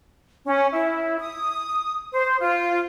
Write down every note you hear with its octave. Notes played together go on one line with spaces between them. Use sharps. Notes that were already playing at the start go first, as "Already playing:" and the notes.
C#4
E4
D#6
C5
F4